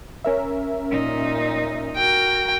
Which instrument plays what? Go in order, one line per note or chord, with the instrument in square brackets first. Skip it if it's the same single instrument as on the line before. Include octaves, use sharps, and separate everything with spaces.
[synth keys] C#4 A#4 E5
[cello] A#2 D#4
[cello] F#4 A#4 [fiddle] G5